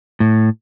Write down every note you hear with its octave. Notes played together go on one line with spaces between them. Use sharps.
A2